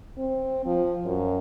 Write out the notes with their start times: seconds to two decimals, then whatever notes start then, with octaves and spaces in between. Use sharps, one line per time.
0.18 C4
0.65 F3
1.05 F#2